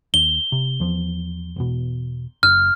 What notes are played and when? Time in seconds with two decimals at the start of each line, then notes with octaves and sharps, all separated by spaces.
0.14 D#2 G7
0.52 C3
0.80 E2 F3
1.56 E1 E2 B2
2.43 F#1 F6